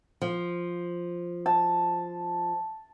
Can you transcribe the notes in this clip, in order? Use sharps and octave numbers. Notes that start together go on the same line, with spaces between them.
F3
A5